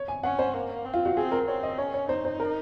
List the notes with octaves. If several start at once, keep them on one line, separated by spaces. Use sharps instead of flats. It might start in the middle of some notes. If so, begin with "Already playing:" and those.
Already playing: C#5
G#5
C#4 F#5
C5
A#3
C4
F4
F#4
C4 G#4
A#4
C4 C#5
D#5
C#4 C#5
C#5
D#4 C5
C5
A#4